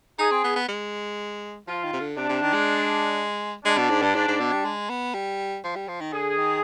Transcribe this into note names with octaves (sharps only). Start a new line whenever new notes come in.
D#4 G#4
C4
B3
B3
G#3
F3 F4
D#3
C3
D3
C3 D4
C3
D#3
G#3
G#3 D4
B2
G#2
G2
G#2
G#2
B2
G3
G#3
B3
G3
F3
G3
F3
D#3
D3 G#4
D#3